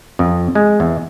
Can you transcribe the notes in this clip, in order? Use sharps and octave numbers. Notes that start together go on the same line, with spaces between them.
F2
G#3
E2